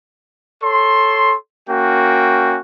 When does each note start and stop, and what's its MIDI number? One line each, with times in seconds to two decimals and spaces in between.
0.63 1.35 69
0.63 1.35 73
0.63 1.35 84
1.69 2.59 58
1.69 2.59 61
1.69 2.59 66
1.69 2.59 79